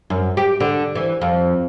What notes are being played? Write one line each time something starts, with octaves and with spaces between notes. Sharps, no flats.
F#2
G4
D3
E3
F2